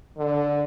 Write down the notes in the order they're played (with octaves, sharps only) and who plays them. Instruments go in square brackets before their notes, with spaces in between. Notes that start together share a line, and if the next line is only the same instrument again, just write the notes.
[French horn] D3